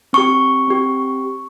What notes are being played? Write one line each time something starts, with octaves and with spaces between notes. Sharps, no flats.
C4 G4 C#6
C4 G4